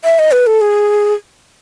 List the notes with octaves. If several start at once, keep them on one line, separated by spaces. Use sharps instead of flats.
E5
D#5
B4
A4
G#4